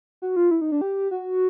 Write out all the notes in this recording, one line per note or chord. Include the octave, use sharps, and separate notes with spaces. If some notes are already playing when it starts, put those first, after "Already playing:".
F#4
F4
E4
D#4
D4
G4
F#4